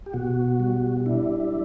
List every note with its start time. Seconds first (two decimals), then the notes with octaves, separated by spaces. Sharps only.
0.06 G4
0.13 B2 F#4
0.60 G3
1.06 D4 E4